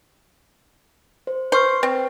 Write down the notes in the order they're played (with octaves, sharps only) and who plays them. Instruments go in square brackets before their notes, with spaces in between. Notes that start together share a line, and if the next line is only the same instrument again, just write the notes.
[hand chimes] C5
[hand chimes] B4 C#6 F6 [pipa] C5
[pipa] C4 [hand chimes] B4